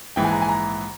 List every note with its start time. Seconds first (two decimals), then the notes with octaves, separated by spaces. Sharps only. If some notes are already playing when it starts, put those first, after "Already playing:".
0.16 A#1 G#2 E3 G5
0.25 G#5
0.32 A#5
0.42 G#5
0.49 A#5